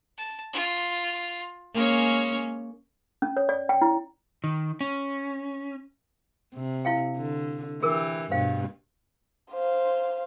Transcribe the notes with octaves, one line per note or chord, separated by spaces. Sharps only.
A5
F4
G#3 A#3 C#4 C#5
C#4
C#5
D5
G5
E4
D#3
C#4
C3
E4 F5 G5
D3
E3 G4 G#4 A#4 E6
G2 B2 C5 F5 G5
C5 F5